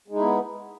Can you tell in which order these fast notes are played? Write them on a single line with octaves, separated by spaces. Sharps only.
G#3 D#4 E4 B3